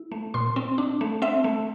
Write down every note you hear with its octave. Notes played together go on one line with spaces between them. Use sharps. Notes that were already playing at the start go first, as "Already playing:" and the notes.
Already playing: E4
A3
A#2 C6
C4
D4
A3
C4 E5
A3